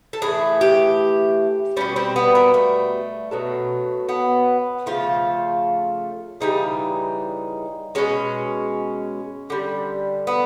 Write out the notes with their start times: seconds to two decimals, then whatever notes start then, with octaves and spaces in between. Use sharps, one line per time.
0.13 A4
0.22 A2 E3 A3 G#4
0.61 G4
1.77 B2 G3 C#4
1.96 C4
2.16 B3
2.35 A#3
2.54 A3
3.31 B2 F#3 A3
4.09 B3
4.86 C#3 F3 A3 F4
6.41 C#3 E3 G3 D#4
7.95 B2 G#3 C#4
9.50 D3 G3
10.27 B3